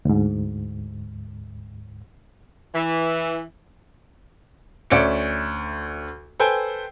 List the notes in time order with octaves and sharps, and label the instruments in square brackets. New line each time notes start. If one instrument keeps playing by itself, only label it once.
[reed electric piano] D2 G#2
[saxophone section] E3
[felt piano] D2 C#4 D5 E5 C#7 D7
A4 B4 C5 G5 G#5